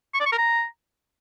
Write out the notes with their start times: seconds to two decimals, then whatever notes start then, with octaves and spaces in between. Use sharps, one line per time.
0.14 C#6
0.20 D5
0.26 C#6
0.32 A#4
0.38 A#5